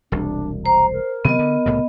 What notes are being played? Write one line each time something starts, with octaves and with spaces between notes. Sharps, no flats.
E1 C2 D4
C5 A#5
A#4
C3 D#3 F#3 B3 D#5
D3
C2 A2 C#3